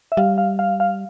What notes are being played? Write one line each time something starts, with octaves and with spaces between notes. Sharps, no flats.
E5
G3 F5
F5
F5
F5